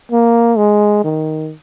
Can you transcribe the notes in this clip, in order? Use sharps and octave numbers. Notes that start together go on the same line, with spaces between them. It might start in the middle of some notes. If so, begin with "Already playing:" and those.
A#3
G#3
D#3